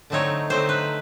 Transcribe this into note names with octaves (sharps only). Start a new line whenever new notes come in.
D3 F#3 A3 C4 D#4 C#5
D3 F#3 A3 C4 D#4 C5
B4